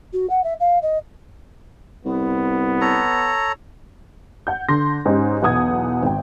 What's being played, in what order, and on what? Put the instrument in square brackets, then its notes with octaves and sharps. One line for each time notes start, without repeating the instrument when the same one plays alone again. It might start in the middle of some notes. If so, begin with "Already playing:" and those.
[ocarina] F#4
F#5
E5
F5
D#5
[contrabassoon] C2 [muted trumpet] B3
[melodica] A4 C#5 A#5
[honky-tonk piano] F#5 G6
D3 C6 A#6
G#2 C#4 D#4 G4
B1 E2 F#5 D#6 G#6
G#1 G5